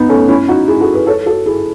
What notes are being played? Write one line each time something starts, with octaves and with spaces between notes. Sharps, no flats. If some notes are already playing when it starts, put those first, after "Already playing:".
Already playing: B3 D#4
A3 C#4
C#4 E4
D#4 F#4
E4 G#4
F#4 A4
G#4 B4
A4 C#5
F#4 A4
E4 G#4